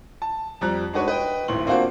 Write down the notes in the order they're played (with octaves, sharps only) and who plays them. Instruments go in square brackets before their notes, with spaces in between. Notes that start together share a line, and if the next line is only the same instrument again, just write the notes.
[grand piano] A5
F2 G3 A#5 F#6
G#3 D4 D#4 F#4 B4 C#5
B4 D#5 G5
D#1 G#1 A2 C6 F#7
A#3 C4 D4 F4 F#4 C5